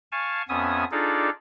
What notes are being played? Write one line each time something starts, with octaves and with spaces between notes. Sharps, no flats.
F5 G#5 A5 C#6
F2 B3 C#4 E5 G#5 D#6
D4 D#4 F4 G#4 A4 D5